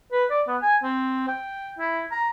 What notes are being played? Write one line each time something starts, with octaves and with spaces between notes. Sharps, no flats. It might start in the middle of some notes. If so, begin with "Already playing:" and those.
B4
D5
B3
G#5
C4
G5
E4
A#5